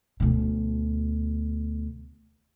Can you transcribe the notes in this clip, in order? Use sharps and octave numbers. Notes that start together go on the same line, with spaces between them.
D2 B2